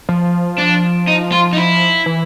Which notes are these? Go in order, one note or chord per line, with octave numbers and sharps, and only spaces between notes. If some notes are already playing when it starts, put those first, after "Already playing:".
F3
D4
D#4
F4
D#4
E4
E3